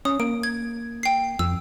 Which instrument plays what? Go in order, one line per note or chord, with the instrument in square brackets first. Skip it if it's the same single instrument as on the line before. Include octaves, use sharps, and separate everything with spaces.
[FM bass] C#4 [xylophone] D#6
[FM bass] A#3 [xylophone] D7
[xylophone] G#6
G5 C7
[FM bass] F2 [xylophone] E6